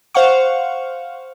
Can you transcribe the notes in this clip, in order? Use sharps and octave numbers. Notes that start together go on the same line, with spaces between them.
C5 F5 F#5 C#6